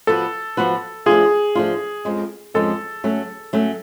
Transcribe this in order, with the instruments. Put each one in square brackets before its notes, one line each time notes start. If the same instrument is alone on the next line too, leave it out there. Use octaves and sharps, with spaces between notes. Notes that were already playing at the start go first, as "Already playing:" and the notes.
[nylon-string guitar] F3 B3 F#4 B4 [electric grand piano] A4
[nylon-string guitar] F3 B3 F#4 B4
[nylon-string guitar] F3 A3 D4 F4 [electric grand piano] G#4
[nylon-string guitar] F3 A3 D4 F4
F2 F3 G#3 C#4
[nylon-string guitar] F2 F3 G#3 C#4 [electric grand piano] A4
[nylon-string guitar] F#3 A3 C#4
F#3 A3 C#4